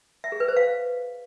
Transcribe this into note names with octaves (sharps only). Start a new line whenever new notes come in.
E5
G#4
B4
C5
F5